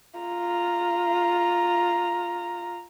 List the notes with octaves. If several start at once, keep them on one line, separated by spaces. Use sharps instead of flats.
F4 A#5